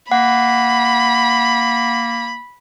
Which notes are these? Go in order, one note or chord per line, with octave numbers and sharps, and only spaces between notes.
A#3 F#5 B5